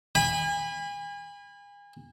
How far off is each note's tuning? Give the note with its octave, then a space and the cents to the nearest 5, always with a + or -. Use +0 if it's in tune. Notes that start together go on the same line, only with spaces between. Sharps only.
G#5 -35 B5 +0